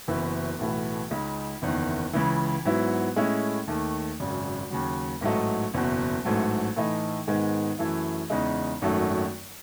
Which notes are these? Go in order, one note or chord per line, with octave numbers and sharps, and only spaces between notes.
F#1 F#2 E3 B3
B1 A2 E3 B3
C#2 C#3 G#3 D#4
F#1 E2 D#3
C#2 C#3 E3
G#2 F#3 B3 E4
A2 G#3 C#4 E4
D#2 D#3 A3
G#1 F#2 C#3
D#2 C#3 F#3
A1 G#2 F#3 A3 D#4
F#1 E2 B2
A1 G#2 F#3 A3
A2 E3 A3 D#4
G#2 D#3 G#3 B3 D#4
F#2 E3 A3 E4
E2 C#3 G#3 D#4
G#1 F#2 D#3 F#3 A3